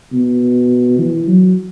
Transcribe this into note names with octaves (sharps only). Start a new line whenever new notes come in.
B2
E3
F#3